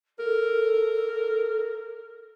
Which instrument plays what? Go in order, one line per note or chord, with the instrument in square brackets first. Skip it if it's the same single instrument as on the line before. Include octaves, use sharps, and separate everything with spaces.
[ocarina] A4 [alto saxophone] A#4